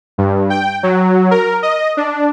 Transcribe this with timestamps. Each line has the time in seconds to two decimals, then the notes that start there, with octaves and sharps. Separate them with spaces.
0.18 G2
0.50 G5
0.83 F#3
1.31 A#4
1.62 D#5
1.97 D4